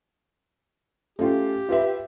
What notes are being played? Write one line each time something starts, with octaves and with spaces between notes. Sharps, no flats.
A3 C#4 F4 G4
F4 B4 E5